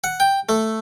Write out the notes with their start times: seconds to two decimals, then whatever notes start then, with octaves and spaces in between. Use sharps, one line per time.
0.04 F#5
0.20 G5
0.49 A3